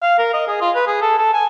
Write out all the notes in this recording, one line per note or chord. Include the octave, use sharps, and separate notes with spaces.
F5
A#4
D#5
G#4
F4
B4
G#4
A4
A4
G#5